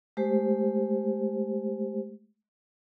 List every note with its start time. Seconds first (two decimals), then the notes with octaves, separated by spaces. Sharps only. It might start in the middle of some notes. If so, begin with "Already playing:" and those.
0.17 G#3 A3 G4 C5